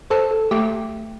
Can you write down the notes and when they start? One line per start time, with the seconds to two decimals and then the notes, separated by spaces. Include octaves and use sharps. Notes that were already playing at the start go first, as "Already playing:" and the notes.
0.10 A4 C5
0.31 A4
0.51 A3 G4